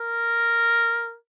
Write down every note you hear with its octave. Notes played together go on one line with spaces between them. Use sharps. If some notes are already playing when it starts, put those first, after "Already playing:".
Already playing: A#4